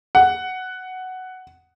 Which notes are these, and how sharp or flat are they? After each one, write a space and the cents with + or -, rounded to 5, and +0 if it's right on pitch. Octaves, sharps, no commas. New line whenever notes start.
F#5 +5